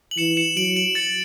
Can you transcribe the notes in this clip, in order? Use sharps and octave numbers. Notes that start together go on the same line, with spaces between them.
F#7
E3 C#7 E7
C#7 E7
F#3 D7 F#7
D7 F#7
A6 C#7